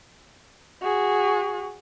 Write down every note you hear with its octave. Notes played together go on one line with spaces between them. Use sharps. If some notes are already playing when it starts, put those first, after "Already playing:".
F#4 G#4